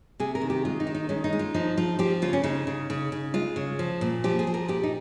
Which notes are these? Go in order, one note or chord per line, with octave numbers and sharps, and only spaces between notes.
C3 G#4
A#4
D#3
G4
G#3 F4
D#4
D#3
D#4
G#3 C#4
D#4
G#3
F4
F3 D#4
F3 F4
F3 G4
C#3 F4
C#4
C#3 D#4
C#3
C#3
C#3
G#3 F4
C#3
F3
A#2
F3 G4
G#4
F3
A#4
A#2 G4
D#4